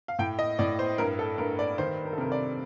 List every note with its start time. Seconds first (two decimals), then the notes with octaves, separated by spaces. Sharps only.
0.08 F5
0.19 A2 G5
0.39 D#5
0.59 A2 D5
0.79 C5
0.98 G2 A#4
1.19 A4
1.38 G2 A#4
1.59 D5
1.78 D#3 C5
2.05 A#4
2.13 A4
2.18 C3 A#4
2.32 D5